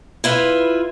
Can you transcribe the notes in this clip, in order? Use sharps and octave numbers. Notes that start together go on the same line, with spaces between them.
E4 F4 B4 E5